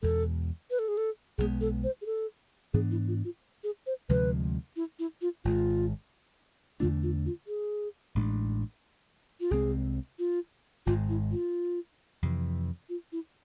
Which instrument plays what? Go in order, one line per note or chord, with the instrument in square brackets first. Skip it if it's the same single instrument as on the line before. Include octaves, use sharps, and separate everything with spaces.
[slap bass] E2 B2 G#3 [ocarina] A4
[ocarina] B4
A4
G#4
A4
[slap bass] B1 B2 G#3 B3 [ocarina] G#4
[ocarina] A4
C5
G#4
A4
[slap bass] G#2 E3 B3 D4 [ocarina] G#4
[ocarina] E4
F4
F4
G#4
C5
[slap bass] D2 C3 F3 G#3 [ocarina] B4
[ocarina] E4
E4
F4
[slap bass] G#1 G#2 G#3 [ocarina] F4
[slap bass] E2 D3 A3 D4 [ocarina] F4
[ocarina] F4
F4
G#4
[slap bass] A1 A2 G#3 D4
[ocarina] F4
[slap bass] C2 C3 G#3 C4 [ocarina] G#4
[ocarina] F4
[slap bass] G#1 G#2 G#3 [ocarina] F4
[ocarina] E4
F4
[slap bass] F2 C3 E3
[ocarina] F4
E4